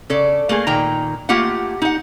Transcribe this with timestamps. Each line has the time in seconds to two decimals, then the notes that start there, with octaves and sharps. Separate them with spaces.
0.10 C#3 A4 D5
0.49 A3 A#3 G#4
0.67 A#2 D#3 G5 A#5
1.29 A3 A#3 F4 G4 F#5
1.82 D#4 F#5